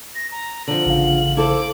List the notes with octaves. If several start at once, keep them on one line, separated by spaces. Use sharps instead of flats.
A#6
A#5
D3 F3 F#7
A1 C#3 F5
E4 A4 C5 D6